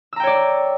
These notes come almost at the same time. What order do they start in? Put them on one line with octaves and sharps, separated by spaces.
E6 A#5 G5 C#5 D5